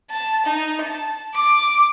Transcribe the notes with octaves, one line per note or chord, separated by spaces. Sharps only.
A5
D#4
A5
D6